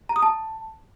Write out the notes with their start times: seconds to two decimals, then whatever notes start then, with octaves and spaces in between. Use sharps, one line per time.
0.09 A#5
0.16 D#6
0.22 A5